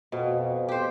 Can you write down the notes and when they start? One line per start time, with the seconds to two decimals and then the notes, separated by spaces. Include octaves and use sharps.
0.12 F2 B2
0.68 G4 C5